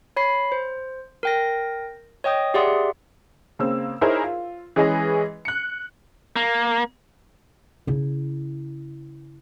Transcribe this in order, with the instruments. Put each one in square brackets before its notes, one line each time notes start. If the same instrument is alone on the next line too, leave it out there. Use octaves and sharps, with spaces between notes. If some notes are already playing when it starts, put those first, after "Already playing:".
[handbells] C#5 B5 C7
C5
A#4 G5 A#6
C#5 D#5 G5 D#6 G6
G4 G#4 D5 E5 F#5 C6
[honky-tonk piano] C#3 A#3 C4 E6
D#4 E4 G#4 A#4 C5 C#5
F4
E3 G#3 C#4 G#4 B4 D#5
F#6 C#7
[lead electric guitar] A#3
[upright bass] C#3 E4